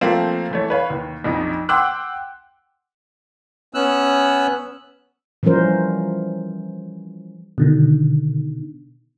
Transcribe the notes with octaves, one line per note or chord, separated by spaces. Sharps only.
F3 A3 A#3 C4
E3 A3 C#5
B4 C#5 F5
D#2
A#1 F2 D#4
F#5 G5 C6 D6 E6 F#6
B3 C#4 E6 F#6
E3 F3 G3 C#4 A#4 C5
B2 D3 D#3